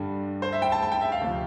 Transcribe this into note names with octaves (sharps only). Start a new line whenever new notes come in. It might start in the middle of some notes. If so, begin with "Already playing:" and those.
Already playing: G2 D3 G3
C5
E5
G5
A5
A5
G5
E5
F5
D2 C3 F3